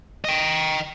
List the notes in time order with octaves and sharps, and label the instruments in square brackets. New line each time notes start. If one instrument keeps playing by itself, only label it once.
[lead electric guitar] D#5 G5